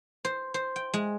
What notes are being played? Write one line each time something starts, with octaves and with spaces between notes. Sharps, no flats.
C5
C5
G5
G#3